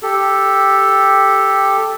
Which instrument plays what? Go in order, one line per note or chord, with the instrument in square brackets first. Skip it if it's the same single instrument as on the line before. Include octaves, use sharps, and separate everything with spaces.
[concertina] G4 A4